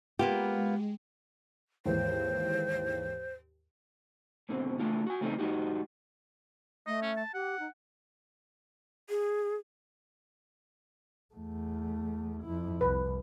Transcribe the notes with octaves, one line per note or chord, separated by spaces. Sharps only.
G#3 A#3 B3 F4 G4
D#2 G#2 E3 C5
G#2 B2 D3 C4
C#3 A3 D4 F4
F#4 G#5
C#3 G3 A3 C4 D#4 A4
G#2 G#3 D#4 F#4 G4
A3 D#5
C#4
A5
G4 F#5
D#4
G#4
E2 A3
F2 E4
C2 B4